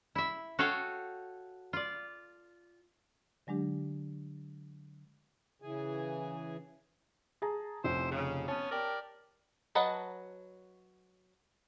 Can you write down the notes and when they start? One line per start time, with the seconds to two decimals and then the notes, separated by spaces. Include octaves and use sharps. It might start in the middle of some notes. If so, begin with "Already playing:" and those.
0.15 E4 E5
0.59 F#4 A4 C#5 F5 G5 G#5
1.73 F4 D5
3.47 D3 F#3 G#3 D4 G4
5.62 C#3 E3 G#4 G#5
7.42 G#4 A5 A#5
7.84 F1 C#4 E4 C5
8.11 C#3
8.48 B3 C#4 A5
8.70 G4 A#4 D5
9.75 F#3 B4 D#5 F#5 A5